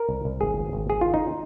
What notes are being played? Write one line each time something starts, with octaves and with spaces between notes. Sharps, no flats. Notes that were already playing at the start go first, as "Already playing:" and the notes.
Already playing: A#4
C2
C2
G#1 G#4
G#1
G#1
G#1 G#4
D#3 F4
D#4